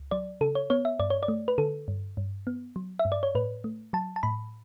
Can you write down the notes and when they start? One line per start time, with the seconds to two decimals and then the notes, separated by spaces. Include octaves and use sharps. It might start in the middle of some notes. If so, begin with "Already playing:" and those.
Already playing: C#2
0.11 F#3 D5
0.41 C#3 A4
0.55 C#5
0.70 B3 C#5
0.85 E5
1.00 G2 D5
1.10 C#5
1.23 D5
1.28 A3
1.48 B4
1.58 D3 A4
1.88 G2
2.17 G2
2.47 B3
2.76 F#3
2.99 E5
3.05 G2
3.12 D5
3.23 C#5
3.35 A2 B4
3.64 A3
3.93 F#3 A5
4.16 A5
4.23 A2 B5